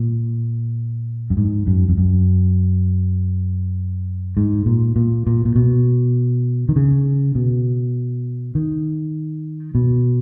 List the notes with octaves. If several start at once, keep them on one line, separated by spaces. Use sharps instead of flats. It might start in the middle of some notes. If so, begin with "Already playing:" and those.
Already playing: A#2
F#2
G#2
F#2
F2
F#2
G#2
A#2
A#2
A#2
A#2
B2
D#3
C#3
B2
D#3
B2